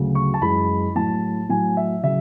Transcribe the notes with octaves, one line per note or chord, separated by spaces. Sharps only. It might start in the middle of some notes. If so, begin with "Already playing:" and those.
Already playing: D2 C#3 F#3
C#6
A5
F#2 E3 G#3 B5
A2 F#3 A5
A2 F#3 G#5
E5
C#3 F#3 E5